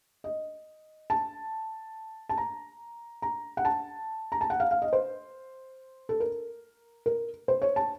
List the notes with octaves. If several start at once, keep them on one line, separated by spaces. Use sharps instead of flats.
D#5
A5
A5
A#5
A#5
F#5
A5
A#5
A5
F#5
F5
F5
D#5
C5
A4
A#4
A#4
C5
C#5
A5